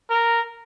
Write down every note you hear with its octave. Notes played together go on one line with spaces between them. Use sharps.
A#4